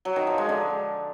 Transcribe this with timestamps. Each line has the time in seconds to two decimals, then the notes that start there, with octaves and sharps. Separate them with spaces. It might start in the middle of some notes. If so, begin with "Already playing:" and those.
0.05 F#3
0.16 D#3
0.27 F3
0.38 G#3
0.49 D3